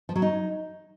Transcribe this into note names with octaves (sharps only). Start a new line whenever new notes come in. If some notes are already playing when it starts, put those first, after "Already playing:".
F3
F#3
D#4